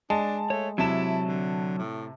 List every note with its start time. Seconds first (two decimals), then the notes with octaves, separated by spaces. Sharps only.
0.10 G#3 D4 A5
0.50 A3 C#5
0.78 C3 F#3 E4 A5 E7
1.26 D3
1.78 A2